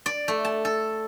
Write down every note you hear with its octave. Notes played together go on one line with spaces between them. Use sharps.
D5
A3
A5
A4